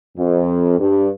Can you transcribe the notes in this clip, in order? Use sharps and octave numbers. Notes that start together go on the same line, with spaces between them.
F2
G2